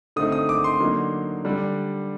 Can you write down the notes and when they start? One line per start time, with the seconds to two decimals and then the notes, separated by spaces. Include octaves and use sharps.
0.16 D3 A3 C4 D#4 D#6
0.32 D#6
0.49 D6
0.64 C6
0.80 D3 F#3 A#3 D#4
1.45 D3 G3 D4